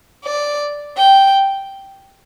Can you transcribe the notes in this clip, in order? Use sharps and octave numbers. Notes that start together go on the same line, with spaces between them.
D5
G5